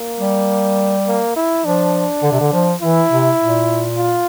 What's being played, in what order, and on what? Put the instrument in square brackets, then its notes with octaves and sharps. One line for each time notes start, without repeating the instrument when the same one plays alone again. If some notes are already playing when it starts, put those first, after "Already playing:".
Already playing: [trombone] A#3
[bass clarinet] G3
[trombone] A#3
E4
[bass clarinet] F3 [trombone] D4
[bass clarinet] D3
C3
D3
F3
[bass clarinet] E3 [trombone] E4
[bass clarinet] C3
A#2
[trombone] F4